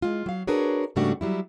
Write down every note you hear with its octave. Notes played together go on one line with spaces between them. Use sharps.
G#3 F4
F#3 F5
D4 F#4 G#4 A#4 B4 C#5
G#2 C#3 G3 A3 D4 F#4
F#3 G3 E4